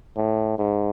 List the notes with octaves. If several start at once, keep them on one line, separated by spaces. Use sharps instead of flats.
A2
G#2